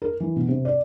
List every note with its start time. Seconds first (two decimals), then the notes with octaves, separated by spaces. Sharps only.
0.02 A#4
0.20 E3
0.36 B2
0.48 C3
0.65 D5